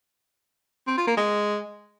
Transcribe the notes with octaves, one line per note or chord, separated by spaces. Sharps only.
C4
F4
A#3
G#3